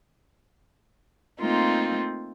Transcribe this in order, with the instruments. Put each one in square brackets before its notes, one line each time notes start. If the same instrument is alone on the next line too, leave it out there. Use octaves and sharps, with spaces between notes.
[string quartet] A3 A#3 C4 D#4 F4